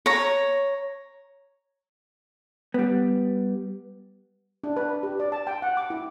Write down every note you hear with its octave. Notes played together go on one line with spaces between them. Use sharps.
C#5 A#5
G3 B3
D4
B4
B4
G4
D5
A5
G5
F#5
D6
E4